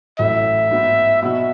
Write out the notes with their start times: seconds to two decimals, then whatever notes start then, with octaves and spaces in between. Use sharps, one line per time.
0.19 A1 A2 F#3 A3 E5
0.71 G#2 F#3 B3
1.22 B2 F#3 B3 F#4 E5